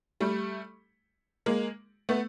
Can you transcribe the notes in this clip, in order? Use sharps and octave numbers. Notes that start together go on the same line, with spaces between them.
G3 A3
G#3 A#3
A3 B3